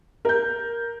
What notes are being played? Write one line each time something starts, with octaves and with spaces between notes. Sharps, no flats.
A#4 G6